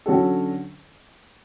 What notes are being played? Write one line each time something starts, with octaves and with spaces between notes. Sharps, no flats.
D3 F#3 C#4 F#4 A4